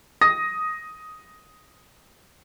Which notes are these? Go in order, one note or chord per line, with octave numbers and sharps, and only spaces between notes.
D#6 A#6